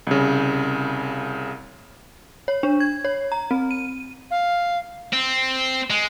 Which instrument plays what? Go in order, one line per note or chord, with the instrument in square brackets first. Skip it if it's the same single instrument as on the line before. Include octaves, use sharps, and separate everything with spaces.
[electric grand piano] C2 C#3
[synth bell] C#5
D4
G#6
C#5
A#5
C4
D#7
[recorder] F5
[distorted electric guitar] C4
G#3